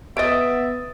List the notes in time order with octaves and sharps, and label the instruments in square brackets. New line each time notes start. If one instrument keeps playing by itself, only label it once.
[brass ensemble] B3 [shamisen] C#5 D#5 [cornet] E5 [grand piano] D#6 A6 D7